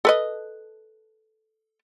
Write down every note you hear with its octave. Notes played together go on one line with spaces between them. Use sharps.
A4 B4 D#5